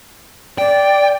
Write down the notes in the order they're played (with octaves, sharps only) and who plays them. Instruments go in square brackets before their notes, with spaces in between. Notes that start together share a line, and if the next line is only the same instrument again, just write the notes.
[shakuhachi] D5 [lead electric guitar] G5